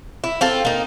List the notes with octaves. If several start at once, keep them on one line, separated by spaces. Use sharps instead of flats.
E4
C4 F4 A4
A#3 D#4